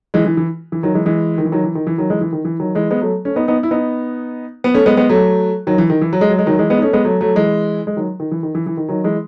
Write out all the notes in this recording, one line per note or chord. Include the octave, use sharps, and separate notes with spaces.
E3 G#3
E3
E3
E3
D#3 F#3
E3 G#3
E3 G#3
D#3
E3
D#3 F#3
E3
D#3
E3
D#3 F#3
E3 G#3
E3
D#3
E3
D#3 F#3
E3 G#3
G#3 B3
F#3 A3
A3 C#4
B3 D#4
B3 D#4
E4
B3 D#4
B3
A3 C#4
G#3 B3
G#3 B3
F#3 A3
D#3 F#3
E3
D#3
E3
F#3
G#3
F#3
G#3
D#3 F#3
E3 G#3
G#3 B3
D#4
A3 C#4
G#3 B3
F#3 A3
F#3 A3
E3 G#3
G#3
D#3 F#3
D#3
E3
D#3
E3
E3
D#3
D#3 F#3
E3 G#3